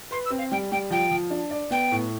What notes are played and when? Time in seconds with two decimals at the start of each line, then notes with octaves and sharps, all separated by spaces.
0.11 B4 C6
0.25 E6
0.30 C4
0.38 F5
0.51 G3 G5
0.71 G3 G5
0.90 F3 G5
1.11 F3
1.30 D4
1.51 D5
1.71 B3 G5
1.92 A2